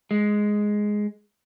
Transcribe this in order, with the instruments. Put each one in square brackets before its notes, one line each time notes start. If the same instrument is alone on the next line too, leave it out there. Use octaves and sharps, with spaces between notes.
[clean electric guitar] G#3